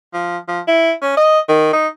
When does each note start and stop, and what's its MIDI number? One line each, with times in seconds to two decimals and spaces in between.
0.13 0.37 53
0.48 0.60 53
0.67 0.92 64
1.02 1.16 61
1.17 1.39 75
1.49 1.72 51
1.73 1.87 63